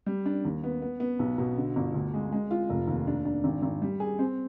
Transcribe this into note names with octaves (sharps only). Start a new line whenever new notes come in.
G3
D4
D#2
B3
B3
B3
B1
B2
D3
G1
D2
G#3
G#3
F4
F1
D#2
D4
D4
G#1
G#1
G3
G#4
C4